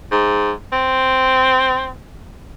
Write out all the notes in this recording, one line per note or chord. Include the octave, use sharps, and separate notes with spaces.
G#2
C4